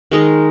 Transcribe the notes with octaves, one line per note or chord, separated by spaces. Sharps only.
D#3 G#3 D#4 A#4